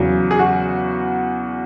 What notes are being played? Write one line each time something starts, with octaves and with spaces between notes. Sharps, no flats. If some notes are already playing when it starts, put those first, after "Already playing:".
Already playing: E2 C#3 F#3
G#4
F#4